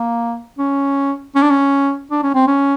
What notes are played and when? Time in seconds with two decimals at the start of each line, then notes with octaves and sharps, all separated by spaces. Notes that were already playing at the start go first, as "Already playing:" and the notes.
Already playing: A#3
0.59 C#4
1.35 C#4
1.42 D4
1.50 C#4
2.11 D4
2.23 C#4
2.35 C4
2.47 C#4